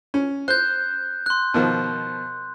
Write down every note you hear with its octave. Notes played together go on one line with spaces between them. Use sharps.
C#4
C5 F#6 G6
C6 F#6
B2 D#3 F3